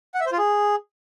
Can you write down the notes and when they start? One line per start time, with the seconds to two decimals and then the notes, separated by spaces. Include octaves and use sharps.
0.14 F#5
0.20 E5
0.26 C5
0.32 F4
0.38 G#4